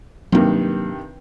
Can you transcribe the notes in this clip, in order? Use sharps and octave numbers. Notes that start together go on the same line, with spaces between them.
G2 C3 D#3 F#3 A#3